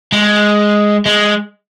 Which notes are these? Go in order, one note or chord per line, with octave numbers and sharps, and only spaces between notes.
G#3
G#3